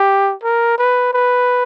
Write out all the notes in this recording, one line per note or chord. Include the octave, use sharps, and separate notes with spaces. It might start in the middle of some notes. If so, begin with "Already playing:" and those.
Already playing: G4
A#4
B4
B4